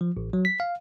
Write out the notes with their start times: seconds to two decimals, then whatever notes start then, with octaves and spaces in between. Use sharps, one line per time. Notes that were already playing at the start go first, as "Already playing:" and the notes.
0.01 F3
0.17 A1
0.33 F#3
0.45 B6
0.60 F5